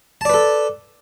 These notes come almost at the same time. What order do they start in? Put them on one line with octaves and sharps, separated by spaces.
A5 D5 B4 A4